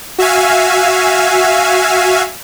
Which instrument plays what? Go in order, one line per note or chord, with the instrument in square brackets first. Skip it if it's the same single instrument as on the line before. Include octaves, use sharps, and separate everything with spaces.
[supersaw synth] F#4 E5 F5 G#5